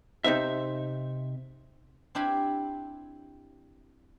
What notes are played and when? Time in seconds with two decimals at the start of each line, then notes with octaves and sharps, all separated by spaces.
0.24 C3 D#4 C5 E5
2.15 C4 D4 E4 G4 G#5 B5